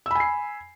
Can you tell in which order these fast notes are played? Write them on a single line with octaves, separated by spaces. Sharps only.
E6 B5 G#5 C7